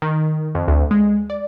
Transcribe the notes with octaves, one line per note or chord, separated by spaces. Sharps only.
D#3
F2
D2
G#3
D5